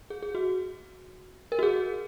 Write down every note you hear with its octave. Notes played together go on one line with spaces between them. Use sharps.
G#4
G#4
F#4
A#4
F#4
G#4